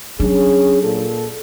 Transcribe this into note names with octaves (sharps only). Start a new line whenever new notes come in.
F#3 C#4 D4 G#4
A#2 A4